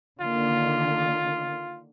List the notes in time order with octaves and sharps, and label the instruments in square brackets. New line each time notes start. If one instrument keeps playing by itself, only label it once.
[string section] D3 D#3 A#3 [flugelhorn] F4